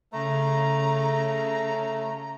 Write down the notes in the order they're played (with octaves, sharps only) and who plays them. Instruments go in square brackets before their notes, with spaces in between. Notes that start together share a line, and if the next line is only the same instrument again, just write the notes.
[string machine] C#3 [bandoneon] A3 [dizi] A#5